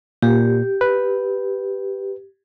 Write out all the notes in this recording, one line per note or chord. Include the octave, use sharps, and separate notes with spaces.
A#2 G4
B4